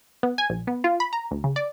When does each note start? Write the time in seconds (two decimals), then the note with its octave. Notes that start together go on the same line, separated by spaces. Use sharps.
0.23 B3
0.38 G#5
0.50 A#1
0.67 B3
0.84 F4
1.00 B5
1.13 A#5
1.31 D2
1.44 C#3
1.56 D5